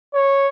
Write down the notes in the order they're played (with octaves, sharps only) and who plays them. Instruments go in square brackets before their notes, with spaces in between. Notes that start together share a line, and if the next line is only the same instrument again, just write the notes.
[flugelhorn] C#5